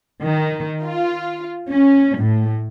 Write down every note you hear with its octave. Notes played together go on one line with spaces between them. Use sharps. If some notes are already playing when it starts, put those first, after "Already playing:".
D#3
F4
C#4
A2